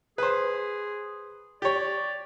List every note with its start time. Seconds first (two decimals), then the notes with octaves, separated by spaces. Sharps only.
0.18 G#4 B4 C5
1.62 G4 C#5 D5